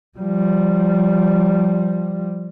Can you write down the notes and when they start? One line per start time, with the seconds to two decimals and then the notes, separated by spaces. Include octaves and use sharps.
0.18 F3 G3